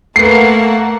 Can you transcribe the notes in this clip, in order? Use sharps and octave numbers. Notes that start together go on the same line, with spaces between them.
A3 A#3 B4 F#5 A5 C7